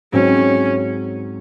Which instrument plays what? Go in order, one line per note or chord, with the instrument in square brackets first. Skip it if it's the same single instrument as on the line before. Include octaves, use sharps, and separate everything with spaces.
[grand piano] G#2 F#3 C4 [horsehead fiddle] C#4